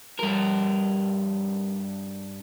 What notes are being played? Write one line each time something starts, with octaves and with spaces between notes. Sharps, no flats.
G2 A#4